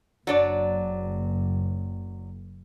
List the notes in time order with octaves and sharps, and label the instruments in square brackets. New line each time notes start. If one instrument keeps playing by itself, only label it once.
[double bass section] F#1 [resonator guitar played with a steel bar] F#3 D4 D5